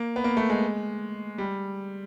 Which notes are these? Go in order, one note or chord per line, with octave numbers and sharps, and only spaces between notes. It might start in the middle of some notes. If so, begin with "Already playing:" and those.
Already playing: A#3
B3
A#3
A3
G#3
G3